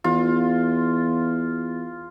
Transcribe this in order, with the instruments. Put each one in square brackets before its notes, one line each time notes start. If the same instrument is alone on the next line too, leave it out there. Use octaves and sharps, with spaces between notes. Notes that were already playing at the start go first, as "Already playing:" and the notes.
[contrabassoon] E2 [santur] F4